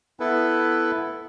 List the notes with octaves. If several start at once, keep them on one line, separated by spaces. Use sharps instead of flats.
B3 E4 A4 B4